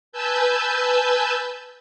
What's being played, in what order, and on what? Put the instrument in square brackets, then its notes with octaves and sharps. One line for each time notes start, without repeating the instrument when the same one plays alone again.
[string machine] B4 G#5 A5 E6 G6